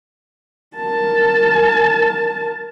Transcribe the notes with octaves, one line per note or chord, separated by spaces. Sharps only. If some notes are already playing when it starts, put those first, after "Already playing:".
A#4 A5